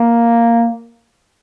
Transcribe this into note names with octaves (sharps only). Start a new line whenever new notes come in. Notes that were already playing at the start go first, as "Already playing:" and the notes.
Already playing: A#3